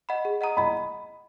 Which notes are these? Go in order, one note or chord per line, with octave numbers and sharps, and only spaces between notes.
D#5 F#5 B5
G#4
D#5 F#5 A#5 D#6
D#5 B5